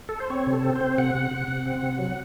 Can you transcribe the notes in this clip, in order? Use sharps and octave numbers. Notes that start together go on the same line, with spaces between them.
A4
C5
C4 C#5
C3
A4
C4
C5
C4
C3 F#5
C3
C3
C3
C4
C3
F#3